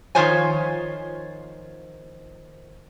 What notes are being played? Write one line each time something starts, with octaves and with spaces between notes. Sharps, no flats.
D#3 F3 F4 C5 C#5 G#5